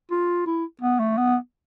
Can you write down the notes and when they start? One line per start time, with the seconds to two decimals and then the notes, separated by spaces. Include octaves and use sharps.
0.11 F4
0.46 E4
0.82 B3
1.00 A3
1.17 B3